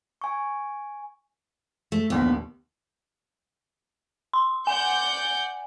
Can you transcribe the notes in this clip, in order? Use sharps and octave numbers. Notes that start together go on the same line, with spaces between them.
G#5 C#6
A3
A#1 D#2 A#2 B3
C6
D5 F#5 G#5 G6